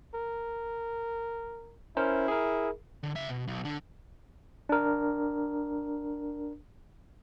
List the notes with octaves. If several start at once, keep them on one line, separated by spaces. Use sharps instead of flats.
A#4
C#4 E4 A#4 C5
G#4 A#4
D3
C#3 E5
B2
B1
D3 D4
D4 A#4